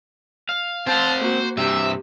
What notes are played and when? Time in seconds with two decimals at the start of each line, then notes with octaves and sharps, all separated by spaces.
0.49 F5
0.87 C4 C5 F5 F#5 A5
1.21 A#3 F#4
1.58 G2 C3 G4 E5